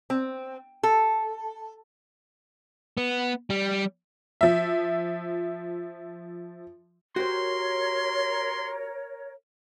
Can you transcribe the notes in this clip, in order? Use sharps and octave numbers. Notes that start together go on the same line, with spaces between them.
C4
A4
B3
G3
F3 E5
F#4 G4 A#4 C5 C#5 C6